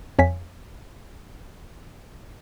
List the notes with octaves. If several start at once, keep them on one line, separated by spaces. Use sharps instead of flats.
F2 C#5 F5 G#5 B6